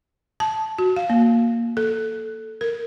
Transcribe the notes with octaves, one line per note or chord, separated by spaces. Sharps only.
A5
F#4
F5
A#3
A4
A#4